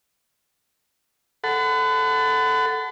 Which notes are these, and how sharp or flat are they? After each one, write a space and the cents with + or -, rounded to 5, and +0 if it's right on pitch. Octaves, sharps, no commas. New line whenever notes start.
A4 +0 F#5 +10 B5 +45